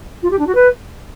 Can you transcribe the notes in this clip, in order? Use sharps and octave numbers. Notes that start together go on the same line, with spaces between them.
F4
G4
D4
F#4
B4